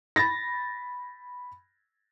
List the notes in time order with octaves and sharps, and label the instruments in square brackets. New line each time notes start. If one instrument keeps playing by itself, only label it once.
[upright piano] B5 A6 A#6